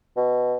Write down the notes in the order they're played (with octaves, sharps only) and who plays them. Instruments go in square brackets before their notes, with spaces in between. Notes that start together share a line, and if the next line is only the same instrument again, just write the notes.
[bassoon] B2